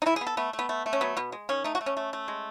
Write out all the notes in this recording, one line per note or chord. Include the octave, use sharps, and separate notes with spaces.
D#4
E3 E4
B3 G#4
A4
A3 B3
A3
B3
A3
A3
C#4
F#3 B3
B2 B3
G#3
D#3 C#4
A3 D#4
F#4
A3
C#4
A3
A3
G#3